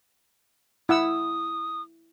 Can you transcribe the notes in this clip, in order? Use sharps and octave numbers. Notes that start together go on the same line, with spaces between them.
E4 F#5 D#6 E6